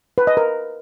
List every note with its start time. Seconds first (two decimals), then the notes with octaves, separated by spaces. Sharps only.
0.18 B4
0.27 D#5
0.37 A#4